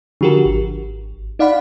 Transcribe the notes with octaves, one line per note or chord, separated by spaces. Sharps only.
D3 F3 F#4 G4 A#4
G#1
D#4 D5 F5 F#5 B5